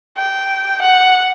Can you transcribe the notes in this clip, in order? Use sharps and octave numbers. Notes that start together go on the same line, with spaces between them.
G5
F#5